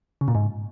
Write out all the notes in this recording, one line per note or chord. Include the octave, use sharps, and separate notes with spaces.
C#3
A#2
G#2